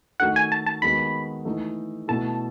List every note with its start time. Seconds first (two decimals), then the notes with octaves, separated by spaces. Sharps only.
0.20 D#3 A3 D#4 F#4 A4 F#5
0.36 G#5
0.52 A5
0.66 A5
0.82 D#3 G#3 B3 F#4 B5
1.45 E3 A3 D#4 A4
2.08 B2 A3 E4 A4 A5